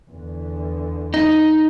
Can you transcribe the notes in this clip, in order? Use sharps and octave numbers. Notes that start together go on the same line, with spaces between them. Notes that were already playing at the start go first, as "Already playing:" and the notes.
E2 D3
D#4